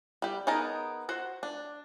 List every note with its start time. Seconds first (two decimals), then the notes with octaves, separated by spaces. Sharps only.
0.22 G3 G4
0.47 B3 D#4 G#4 A#4 A5
1.09 F#4 C5
1.43 D4